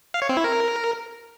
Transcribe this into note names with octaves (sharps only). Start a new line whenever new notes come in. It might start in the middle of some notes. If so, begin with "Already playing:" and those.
F5
C#5
C4
E4
A#4